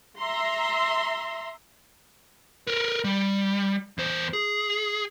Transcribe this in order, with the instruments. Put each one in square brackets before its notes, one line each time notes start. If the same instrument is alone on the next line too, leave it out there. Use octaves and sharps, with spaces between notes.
[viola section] E5 A#5 C6
[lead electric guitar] A#4 B4
G3
E2 C5
G#4